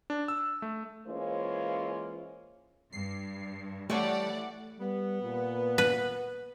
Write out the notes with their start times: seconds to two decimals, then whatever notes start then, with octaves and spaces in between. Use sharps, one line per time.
0.10 D4
0.28 E6
0.62 A3
1.06 E3 G#3 A#3 C#4 F4 C5
2.93 G2 C7
3.90 E3 G3 A3 A4 C#5 D5 F#5
4.80 G3 B3
5.23 A#2
5.78 B4